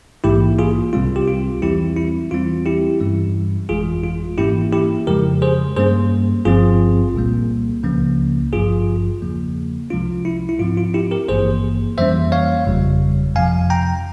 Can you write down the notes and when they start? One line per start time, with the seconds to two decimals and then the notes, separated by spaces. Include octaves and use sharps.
0.24 A#1 G#2 E3 A#3 E4 G4
0.59 F4 G#4
0.93 C2 C3 G3 C4 F4
1.16 G4
1.27 F4
1.62 E2 E3 G3 C4 E4 G4
1.97 E4
2.31 E2 E3 G3 C4 F4
2.66 E4 G4
3.00 G2 E3 G3 C#4
3.69 G1 F2 E3 G#3 F4 G#4
4.03 F4
4.38 G#2 E3 A#3 C#4 E4 G4
4.73 E4 G4
5.07 F2 C#3 F3 G#3 G4 A#4
5.42 G#4 C5
5.76 G2 G3 A#3 C#4 G#4 C5
6.45 G1 G2 F3 C4 F4 G#4
7.14 C2 A#2 G3 A#3
7.83 C#2 C#3 F3 A#3 C#4
8.53 G#1 G2 F3 F4 G#4
9.22 E2 C#3 F3 A#3
9.90 C2 C3 F3 G#3 C#4 F4
10.25 E4
10.49 E4
10.59 G#2 F3 C4 F4
10.77 F4
10.94 E4 G4
11.11 G4 A#4
11.28 G#1 G2 E3 A#3 G#4 C5
11.98 F2 E3 G3 A#3 C#4 C5 E5
12.32 C#5 F5
12.67 G1 F2 C#3 G3
13.36 F2 C3 F3 F5 G#5
13.70 G5 A#5